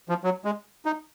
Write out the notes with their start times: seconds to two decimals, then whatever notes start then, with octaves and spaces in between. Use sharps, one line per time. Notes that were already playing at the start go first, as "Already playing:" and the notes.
0.09 F3
0.24 F#3
0.45 G#3
0.85 D#4